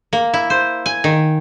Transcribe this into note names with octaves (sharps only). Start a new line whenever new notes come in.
A#3
E4
C5
G#5
D#3